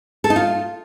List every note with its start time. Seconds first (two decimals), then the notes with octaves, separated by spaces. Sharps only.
0.24 A4
0.30 D#4
0.36 F4